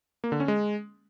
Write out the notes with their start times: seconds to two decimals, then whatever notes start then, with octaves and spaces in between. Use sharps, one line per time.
0.24 A#3
0.32 D3
0.40 C#4
0.48 G#3